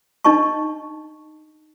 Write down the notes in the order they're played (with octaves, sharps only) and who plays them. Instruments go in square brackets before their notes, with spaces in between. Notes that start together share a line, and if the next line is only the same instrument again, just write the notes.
[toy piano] D4 D#4 D#5 A5 C#6